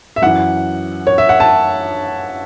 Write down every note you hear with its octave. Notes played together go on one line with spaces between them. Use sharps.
E5
F#2 E3 F#5
C#5
E5
F#5
A5